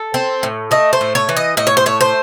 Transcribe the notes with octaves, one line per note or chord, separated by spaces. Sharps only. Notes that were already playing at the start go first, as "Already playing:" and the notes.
Already playing: A4
C4
A2
A3 D#5
C5
A2
C#5
E3
D#5
A2 D#5
C#5
C5
A3 C#5
C5